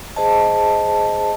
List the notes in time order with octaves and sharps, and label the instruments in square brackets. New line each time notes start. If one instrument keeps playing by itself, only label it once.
[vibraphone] G#4 C5 D#5 A5